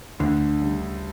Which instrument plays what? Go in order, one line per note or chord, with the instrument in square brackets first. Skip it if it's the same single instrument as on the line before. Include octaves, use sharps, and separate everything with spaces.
[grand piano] D2 [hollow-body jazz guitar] D3
[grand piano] C#3 G3 C#4